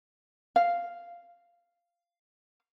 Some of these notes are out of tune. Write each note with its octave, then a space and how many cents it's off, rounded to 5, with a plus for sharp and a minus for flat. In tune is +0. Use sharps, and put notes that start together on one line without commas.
F5 -5